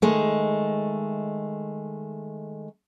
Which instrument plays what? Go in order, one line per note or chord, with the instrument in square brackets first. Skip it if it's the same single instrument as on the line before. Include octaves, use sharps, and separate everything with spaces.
[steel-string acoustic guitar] D#3 G#3 A3